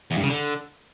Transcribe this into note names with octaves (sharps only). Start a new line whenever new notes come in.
E2
G2
C#3
D3